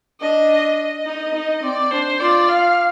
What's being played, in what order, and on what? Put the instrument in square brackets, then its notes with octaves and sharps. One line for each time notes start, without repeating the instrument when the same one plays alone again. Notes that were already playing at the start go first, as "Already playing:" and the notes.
[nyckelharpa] D4 [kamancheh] D#5
[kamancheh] D#5
[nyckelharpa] D#4
D#4
[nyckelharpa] C4 [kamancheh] D5
[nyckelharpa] D4 [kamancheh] C5
[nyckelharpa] F4 [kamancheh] D5
[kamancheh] F5